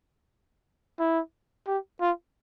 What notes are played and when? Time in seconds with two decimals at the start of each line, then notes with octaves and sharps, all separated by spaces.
0.99 E4
1.67 G4
2.01 F4